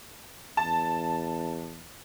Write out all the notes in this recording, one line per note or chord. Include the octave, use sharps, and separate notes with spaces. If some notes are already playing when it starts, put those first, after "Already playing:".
E2 A5